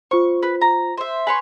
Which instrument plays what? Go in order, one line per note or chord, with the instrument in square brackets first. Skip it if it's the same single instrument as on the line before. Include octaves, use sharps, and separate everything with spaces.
[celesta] F4 C5 [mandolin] C#6
[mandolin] B4
A#5
C5 E5
[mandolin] B4 C#5 C6 [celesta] G#5